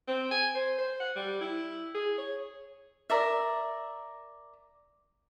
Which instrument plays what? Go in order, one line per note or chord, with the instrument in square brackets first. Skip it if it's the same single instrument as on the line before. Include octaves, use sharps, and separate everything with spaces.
[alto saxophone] C4
G#5
C5
C5
F#5
G3
E4
G#4
C#5
[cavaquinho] A#4 D5 E5